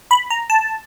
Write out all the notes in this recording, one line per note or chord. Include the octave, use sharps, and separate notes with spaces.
B5
A#5
A5